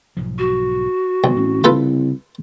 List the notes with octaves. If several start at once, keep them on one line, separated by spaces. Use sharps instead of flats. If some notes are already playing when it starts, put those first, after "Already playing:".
B1 G#2 F3
F#4
B1 C3 D#3 G3
A1 A2 E3 C4
C2 C#3 C4 F4 A4 B4